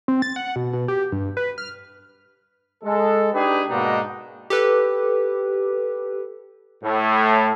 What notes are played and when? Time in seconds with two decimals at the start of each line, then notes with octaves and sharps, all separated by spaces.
0.08 C4
0.22 A6
0.36 F#5
0.56 B2
0.73 B2
0.88 G4
1.12 G2
1.37 B4
1.58 F6
2.83 G#3 A4
3.33 D4 D#4 G4 G#4 B4
3.69 G#2 B2 A#3 D4 D#4
4.50 G4 A4 B4
6.83 A2